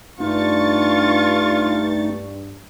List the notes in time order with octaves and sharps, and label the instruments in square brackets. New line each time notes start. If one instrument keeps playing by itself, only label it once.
[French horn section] G2 [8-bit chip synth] A3 D#4 [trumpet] F4 [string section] C#6 A6